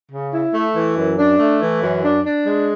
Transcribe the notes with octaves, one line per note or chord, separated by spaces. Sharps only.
C#3
E4
A3
E3
F#2
D4
A3
E3
F#2
D4
D4
G#3